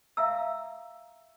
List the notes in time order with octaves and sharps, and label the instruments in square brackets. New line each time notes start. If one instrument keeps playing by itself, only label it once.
[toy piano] E5 F5 A#5 E6